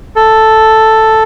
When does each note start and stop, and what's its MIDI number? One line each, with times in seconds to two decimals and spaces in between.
0.16 1.23 69